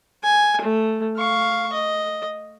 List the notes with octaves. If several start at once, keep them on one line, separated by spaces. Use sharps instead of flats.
G#5
A3
F5 C#6
D#5